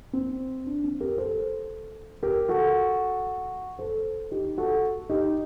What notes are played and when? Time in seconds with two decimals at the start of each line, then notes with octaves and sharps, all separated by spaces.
0.13 C4
0.66 D4
0.84 C4
1.00 G4 A#4
1.18 A4 C5
2.23 G4 A#4
2.49 F#4 A4
3.79 A4 C5
4.31 D#4 G4
4.58 F#4 A4
5.10 D#4 G4